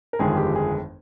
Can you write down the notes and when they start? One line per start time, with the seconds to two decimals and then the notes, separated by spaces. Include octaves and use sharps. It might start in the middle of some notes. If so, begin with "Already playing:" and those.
0.13 A#4
0.19 G1 F2 D#3 G#3 G#4
0.37 G4
0.55 G#4